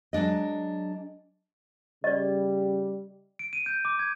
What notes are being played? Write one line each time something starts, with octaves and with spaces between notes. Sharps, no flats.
F#3 G#3 D4 D#5
C#3 G3 D5 D#5
D7
D#7
G6
D6
G#6